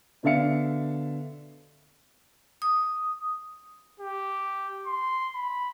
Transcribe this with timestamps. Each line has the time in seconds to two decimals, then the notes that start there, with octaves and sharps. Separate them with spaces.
0.23 B2 D3 D4 E5 F5 C#7
2.62 D#6
4.00 G4
4.87 C6
5.35 B5